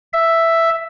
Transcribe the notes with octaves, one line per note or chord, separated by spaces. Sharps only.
E5